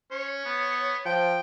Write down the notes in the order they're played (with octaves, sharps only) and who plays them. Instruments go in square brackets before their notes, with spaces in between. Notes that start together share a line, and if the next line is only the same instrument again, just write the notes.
[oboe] C#4 [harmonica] C#5
[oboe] B3
[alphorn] F3 [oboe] G5